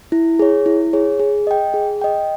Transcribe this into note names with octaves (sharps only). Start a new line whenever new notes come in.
E4
G#4 C#5
E4
G#4 C#5
G#4
D#5 G5
G#4
D#5 G5